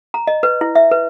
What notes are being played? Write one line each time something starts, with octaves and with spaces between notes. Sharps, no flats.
A#5
D#5
B4
E4
E5
B4